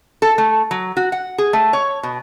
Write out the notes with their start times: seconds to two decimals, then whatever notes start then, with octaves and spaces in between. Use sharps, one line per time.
0.22 A4
0.38 A3
0.71 F#3
0.97 F#4
1.12 F#5
1.38 G#4
1.53 A3
1.73 C#5
2.03 B2